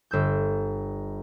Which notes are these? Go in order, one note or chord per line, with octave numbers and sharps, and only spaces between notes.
G1 E6 G6